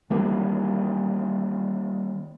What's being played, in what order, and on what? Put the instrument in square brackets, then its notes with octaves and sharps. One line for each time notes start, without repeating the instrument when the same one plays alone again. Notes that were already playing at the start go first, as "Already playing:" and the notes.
[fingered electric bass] D#3 E3 G3 A#3